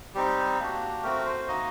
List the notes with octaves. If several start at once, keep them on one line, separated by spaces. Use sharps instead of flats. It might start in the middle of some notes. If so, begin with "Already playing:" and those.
G3 C4 D#4 G4
A#3 D4 F#4
A3 C4 F#4 A#4
C5
A#3 D#4 F#4 D#5